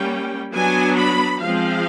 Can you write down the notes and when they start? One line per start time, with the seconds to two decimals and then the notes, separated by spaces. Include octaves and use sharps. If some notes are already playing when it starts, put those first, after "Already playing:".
Already playing: G3 A#3 C#4 G5
0.54 F#3 B3 D4 G#5
0.98 B5
1.42 F3 G#3 C4 F5